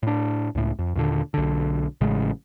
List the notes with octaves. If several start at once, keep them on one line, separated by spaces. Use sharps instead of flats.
A2 D4
C#2 A2
F2
D#2 A#2 D3
B1 D3
A1 A2 C#3 G#3